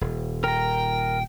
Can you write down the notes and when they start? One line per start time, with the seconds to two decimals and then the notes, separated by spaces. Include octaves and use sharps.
0.01 D#1
0.44 A#4 G5 A#5